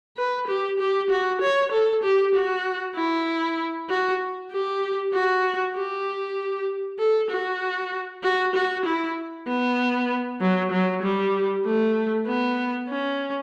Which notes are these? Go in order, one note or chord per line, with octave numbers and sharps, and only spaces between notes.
B4
G4
G4
F#4
C#5
A4
G4
F#4
E4
F#4
G4
F#4
G4
A4
F#4
F#4
F#4
E4
B3
F#3
F#3
G3
A3
B3
C#4